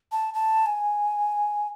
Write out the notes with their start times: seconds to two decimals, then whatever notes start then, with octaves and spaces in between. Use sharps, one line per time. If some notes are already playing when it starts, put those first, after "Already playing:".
0.12 A5
0.34 A5
0.66 G#5